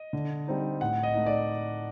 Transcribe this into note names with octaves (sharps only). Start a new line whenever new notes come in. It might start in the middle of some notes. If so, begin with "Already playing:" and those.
Already playing: D#5
D3
G3 C4 D#4
A2 F#5
D#5
A3 D#4
D5